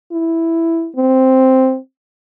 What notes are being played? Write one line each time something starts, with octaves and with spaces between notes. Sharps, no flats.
E4
C4